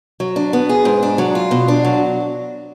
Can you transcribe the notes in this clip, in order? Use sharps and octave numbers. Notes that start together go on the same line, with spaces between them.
F#3
D4
B3
G#4
G#2
D4
F#3
F4
B2
D4
F#3